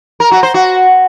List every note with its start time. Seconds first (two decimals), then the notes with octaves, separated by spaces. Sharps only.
0.20 A#4
0.31 F#4
0.43 C5
0.54 F#4